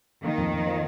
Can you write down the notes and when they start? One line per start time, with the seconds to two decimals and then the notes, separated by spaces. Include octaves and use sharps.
0.24 D#3 A#3
0.38 F2
0.53 F2
0.67 F3